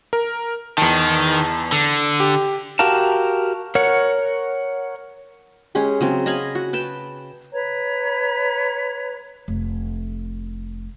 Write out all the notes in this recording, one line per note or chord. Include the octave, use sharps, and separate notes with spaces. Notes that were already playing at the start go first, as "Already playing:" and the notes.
A#4
E2 D#3 A5
D3
G4
F#4 G4 A#4 F5 A5
A#4 C#5 F#5
G#3 C#4 G4 G#4
C#3 F#3 C4
D#5 F5 G#5 B5
F#4
B4 G5 A5
B4 C#5 A#5
F1